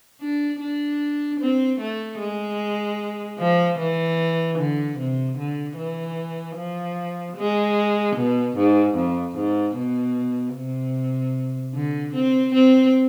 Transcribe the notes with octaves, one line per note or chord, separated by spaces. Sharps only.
D4
D4
C4
A3
G#3
F3
E3
D3
C3
D3
E3
F3
G#3
B2
G#2
F2
G#2
B2
C3
D3
C4
C4